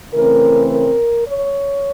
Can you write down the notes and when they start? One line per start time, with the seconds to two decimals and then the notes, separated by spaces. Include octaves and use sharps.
0.12 C#3 E3 A3 C4 A#4
0.70 A#4
1.26 C#5